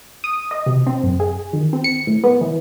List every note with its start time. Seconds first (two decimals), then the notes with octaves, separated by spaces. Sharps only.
0.24 D#6
0.51 D#5
0.66 C3
0.87 C4
1.03 F#2
1.20 G#4
1.53 D#3
1.73 C4
1.84 C#7
2.07 A2
2.24 B3
2.41 E3